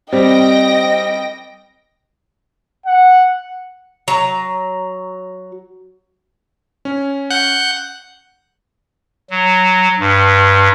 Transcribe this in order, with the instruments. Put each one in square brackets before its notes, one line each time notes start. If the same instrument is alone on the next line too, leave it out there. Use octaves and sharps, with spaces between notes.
[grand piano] G3 [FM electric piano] C4 [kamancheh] D#5 [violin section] G5 A#6 D7
[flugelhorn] F#5
[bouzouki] F#3 A#5
[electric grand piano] C#4
[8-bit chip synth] F#5 F#6 G6
[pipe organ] F#3
G2